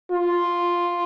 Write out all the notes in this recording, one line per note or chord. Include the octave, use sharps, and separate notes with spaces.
F4